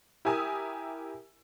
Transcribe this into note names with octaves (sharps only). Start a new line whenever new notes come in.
E4 G4 A#4 G#5 D#6 E6